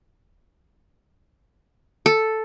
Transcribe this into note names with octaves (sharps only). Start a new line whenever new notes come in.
A4